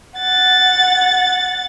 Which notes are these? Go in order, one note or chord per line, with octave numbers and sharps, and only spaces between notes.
F#5 A6